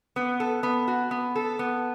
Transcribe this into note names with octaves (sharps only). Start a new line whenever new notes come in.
B3
A4
B3
F#4
B3
A4
B3